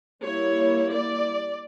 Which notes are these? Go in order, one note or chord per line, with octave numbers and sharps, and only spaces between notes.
G3 A#3 E4 C#5
D5